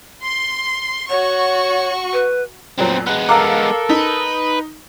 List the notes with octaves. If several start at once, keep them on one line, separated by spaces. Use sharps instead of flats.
C6
F#4 C#5 C#6
B4
F2 A#2 F#3 B3 C4
G#3 B3 F#6
A4 A#4 F5 A#5 D6
D#4 B4